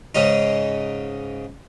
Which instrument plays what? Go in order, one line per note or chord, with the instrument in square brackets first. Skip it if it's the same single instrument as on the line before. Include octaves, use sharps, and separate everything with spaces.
[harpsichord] G#2 C#3 D#4